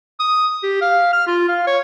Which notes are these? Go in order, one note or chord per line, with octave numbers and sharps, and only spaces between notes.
D#6
G4
F5
F6
F4
F5
C#5